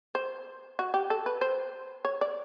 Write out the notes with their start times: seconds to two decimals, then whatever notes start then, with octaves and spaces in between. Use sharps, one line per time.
0.15 C5
0.79 F#4
0.94 G4
1.10 A4
1.26 B4
1.41 C5
2.05 C#5
2.21 D5